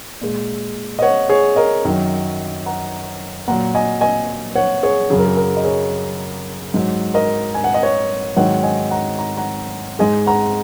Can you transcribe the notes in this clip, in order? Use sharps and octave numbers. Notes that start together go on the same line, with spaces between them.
A#2 G#3
D#5
C#5 F#5
G#4 C#5
A#4 D#5
F#2 D#3 F#3
F#5 A#5
A#2 F#3 F#5 A#5
D#5 G#5
D#5 G#5
C#5 F#5
G#4 C#5
F#2 C#3 F#3 G#4
A#4
G#4
A#4
D#5
G#4 C#5
G#2 F#3
A#4 D#5
G#5
F#5
D#5
C#5 F#5
G#2 D#3 F#3 C#5 F#5
D#5 G#5
F#5 A#5
A#5
F#5 A#5
G#2 G#3 D#5 G#5
F#5 A#5